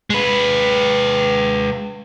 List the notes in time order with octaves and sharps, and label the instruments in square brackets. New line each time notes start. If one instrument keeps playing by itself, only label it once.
[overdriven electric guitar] G#3 B4